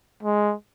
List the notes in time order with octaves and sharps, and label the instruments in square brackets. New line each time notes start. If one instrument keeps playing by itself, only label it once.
[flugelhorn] G#3